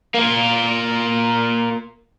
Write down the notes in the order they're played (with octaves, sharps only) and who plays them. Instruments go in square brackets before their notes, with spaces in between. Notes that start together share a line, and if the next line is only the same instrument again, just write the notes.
[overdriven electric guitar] A#3 F4